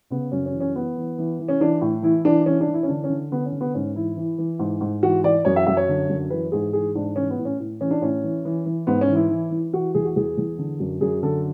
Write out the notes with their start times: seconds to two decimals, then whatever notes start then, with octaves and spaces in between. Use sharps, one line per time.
0.10 C#3 B3
0.32 F#2 C#4
0.46 C#4
0.53 E3
0.60 C#4
0.75 E3 B3
0.97 E3
1.18 E3
1.39 E3
1.48 C#4
1.60 E3 D4
1.81 A2
2.03 E3 E4
2.25 E3 D4
2.46 E3 C#4
2.61 D4
2.67 E3
2.74 E4
2.83 C#4
2.88 D3 D4
3.04 C#4
3.10 D3
3.32 D3 B3
3.46 C#4
3.52 D3
3.61 B3
3.74 G#2 C#4
3.96 E3 E4
4.16 E3
4.38 E3
4.59 G#2
4.81 G#2
5.03 E3 F#4
5.24 E3 D5
5.45 F#2 C#5
5.56 E5
5.66 F#2 E5
5.77 C#5
5.89 D3
6.09 F#2
6.30 E3 B4
6.52 G#2 G#4
6.73 E3 G#4
6.95 G#2 D4
7.16 E3 C#4
7.30 B3
7.38 A2
7.45 C#4
7.60 A2
7.80 E3 C#4
7.91 D4
8.01 A2 C#4
8.24 E3
8.45 E3
8.66 E3
8.87 G#2 B3
9.01 C#4
9.09 E3
9.15 E4
9.30 E3
9.51 E3
9.73 E3 F#4
9.95 E2 G#4
10.05 F#4
10.16 E2 G#4
10.38 E2
10.59 D3
10.80 F#2
11.01 F#2 G#4
11.23 D3 A4